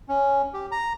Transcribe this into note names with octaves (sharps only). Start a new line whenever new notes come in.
C#4
G4
A#5